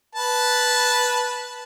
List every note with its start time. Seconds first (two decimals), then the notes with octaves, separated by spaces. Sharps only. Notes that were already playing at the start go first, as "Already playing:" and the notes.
0.15 B4 A5